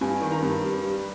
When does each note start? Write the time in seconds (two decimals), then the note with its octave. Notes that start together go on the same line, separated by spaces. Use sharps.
0.01 G2 G#5
0.21 D#3
0.32 A#5
0.42 G2
0.62 G3
0.83 G3